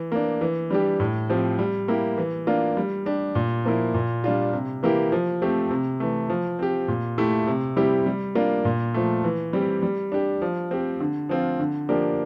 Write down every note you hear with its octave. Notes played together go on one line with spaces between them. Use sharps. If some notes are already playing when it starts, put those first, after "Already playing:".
Already playing: E3
A#3 D4
E3
G3 D4 G4
A2
F3 C4 G4
G3
A#3 E4 G4
E3
A#3 D4 F4
G3
D4 G4
A#2
F3 A#3 E4
A#2
G3 D4 F4
C3
E3 A#3 E4 G4
F3
A3 C4 G4
C3
E3 A3
F3
C4 G4
A#2
A3 E4 G4
C3
G3 C4 E4 G4
G3
A#3 D4 F4
A#2
F3 A3
E3
G3 C4 G4
G3
D4 G4
F3
C4 G4
D3
F3 C4 F4
D3
F3 A#3 D4 G4